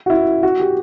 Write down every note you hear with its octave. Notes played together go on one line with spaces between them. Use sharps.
F#4
E4
F#4
G4